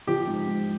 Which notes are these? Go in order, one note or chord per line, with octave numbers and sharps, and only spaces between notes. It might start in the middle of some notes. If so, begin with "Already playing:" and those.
F3 G4
G#2
G#2